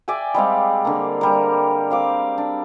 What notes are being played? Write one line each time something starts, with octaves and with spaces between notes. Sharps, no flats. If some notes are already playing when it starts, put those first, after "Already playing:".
D5 E5 G5 G#5
G3 G#3 C4 F5
D3 A#3
G3 A#4
C4 F5 D6
D4